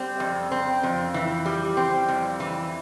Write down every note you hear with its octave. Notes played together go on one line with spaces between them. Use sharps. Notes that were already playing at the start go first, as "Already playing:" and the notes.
Already playing: G3 C4
F2
C4
F2
E3
G3
C4
F2
E3